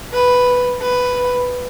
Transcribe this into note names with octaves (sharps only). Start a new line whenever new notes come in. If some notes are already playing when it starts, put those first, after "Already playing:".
B4
B4